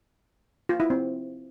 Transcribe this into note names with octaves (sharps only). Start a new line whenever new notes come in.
F4
E4
C4